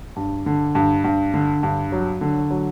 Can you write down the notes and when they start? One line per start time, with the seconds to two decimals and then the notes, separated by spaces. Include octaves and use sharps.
0.16 G2
0.46 D3
0.75 G2
1.04 G2
1.34 D3
1.63 G2
1.92 F#3
2.21 D3
2.50 F#3